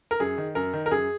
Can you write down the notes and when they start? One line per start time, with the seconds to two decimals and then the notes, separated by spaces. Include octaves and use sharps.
0.11 A#4
0.20 F#2 G#4
0.38 D#3
0.55 F#2 A#4
0.73 D#3
0.86 A#4
0.91 F#2 G#4